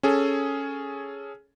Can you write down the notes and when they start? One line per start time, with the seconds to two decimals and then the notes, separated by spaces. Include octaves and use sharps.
0.03 C#4 G#4 A4